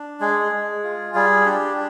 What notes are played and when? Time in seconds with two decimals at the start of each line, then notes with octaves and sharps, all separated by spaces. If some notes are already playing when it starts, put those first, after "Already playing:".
Already playing: D4
0.20 G#3 G#4
0.52 G#3
0.83 F4
1.14 G3 G#4
1.46 D4 G4